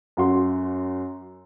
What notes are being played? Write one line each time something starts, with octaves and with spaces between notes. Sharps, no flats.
F#2 F#4 C6